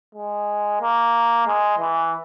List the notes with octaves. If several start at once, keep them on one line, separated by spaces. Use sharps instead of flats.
G#3
A#3
G#3
E3